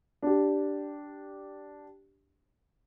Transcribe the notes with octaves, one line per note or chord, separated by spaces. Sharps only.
D4 G4